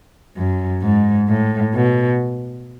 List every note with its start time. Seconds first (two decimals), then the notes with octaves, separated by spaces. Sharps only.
0.37 F#2
0.82 G#2
1.28 A2
1.74 B2